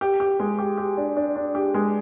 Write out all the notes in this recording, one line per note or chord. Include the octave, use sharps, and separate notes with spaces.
G4
G4
G#3
G4
G4
D4
D4
D4
G4
G#3